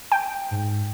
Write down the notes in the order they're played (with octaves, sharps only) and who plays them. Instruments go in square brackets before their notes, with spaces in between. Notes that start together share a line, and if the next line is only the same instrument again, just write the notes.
[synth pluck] G5
[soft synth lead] G#2